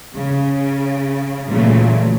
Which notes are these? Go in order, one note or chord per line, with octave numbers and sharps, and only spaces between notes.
C#3
A#2 C#3 E3 F#3 A3